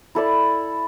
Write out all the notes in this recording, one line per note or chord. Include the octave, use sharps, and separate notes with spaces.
E4 A4 D5